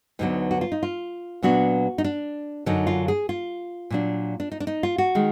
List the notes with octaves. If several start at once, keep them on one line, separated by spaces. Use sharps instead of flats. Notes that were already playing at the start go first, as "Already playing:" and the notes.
D2 D3 F#3 B3 D#4
F#4
F4
D#4
F4
A#2 F#3 B3 D4 F#4
D#4
D4
F#2 D3 F#3 D#4
F4
G#4
F4
A#2 F#3 D4
D4
D#4
D4
D#4
F4
F#4
D#3 G#3